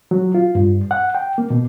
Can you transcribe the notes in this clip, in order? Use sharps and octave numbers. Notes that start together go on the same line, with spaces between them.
F#3
F4
G2
F#5
G5
A#3
B2